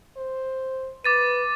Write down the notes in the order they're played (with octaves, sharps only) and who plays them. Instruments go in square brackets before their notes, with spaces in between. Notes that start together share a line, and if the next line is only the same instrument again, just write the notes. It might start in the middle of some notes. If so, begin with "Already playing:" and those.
[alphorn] C5
[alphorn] B4 [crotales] D6 A6 D#7